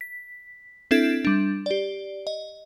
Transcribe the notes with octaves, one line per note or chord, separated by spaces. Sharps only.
B6
C4 D4 E4 A4 E5 G#6
G3 D4
G4 D5
D#5